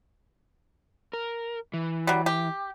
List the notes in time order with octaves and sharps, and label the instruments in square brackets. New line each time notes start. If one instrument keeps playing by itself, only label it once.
[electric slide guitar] A#4
E3
[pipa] F#3 G3
G4